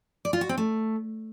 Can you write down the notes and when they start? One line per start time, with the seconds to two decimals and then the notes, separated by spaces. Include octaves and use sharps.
0.25 D5
0.33 F4
0.41 F#4
0.49 C4
0.58 A3